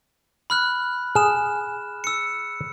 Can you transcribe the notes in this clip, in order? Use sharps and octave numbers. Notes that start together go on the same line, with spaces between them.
B5 F6 F#6
G#4 F6 E7
E6 C#7